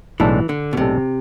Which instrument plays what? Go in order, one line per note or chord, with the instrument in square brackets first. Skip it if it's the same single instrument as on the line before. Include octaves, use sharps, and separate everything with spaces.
[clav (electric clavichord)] B1 A2 G#3 D4 A4 [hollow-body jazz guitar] E3
[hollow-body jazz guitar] D3
B2
[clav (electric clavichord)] B1 A2 G#3 D4 A4 [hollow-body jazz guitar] C3